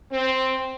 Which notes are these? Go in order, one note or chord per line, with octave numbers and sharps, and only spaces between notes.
C4